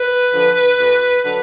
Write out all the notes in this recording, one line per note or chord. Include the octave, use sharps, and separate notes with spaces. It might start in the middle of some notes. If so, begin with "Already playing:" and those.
Already playing: B4
D3 F3
D2
D3 F#3